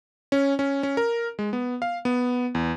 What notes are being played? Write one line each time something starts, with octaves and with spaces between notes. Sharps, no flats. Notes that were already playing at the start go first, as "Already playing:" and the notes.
C#4
C#4
C#4
A#4
G#3
B3
F5
B3
E2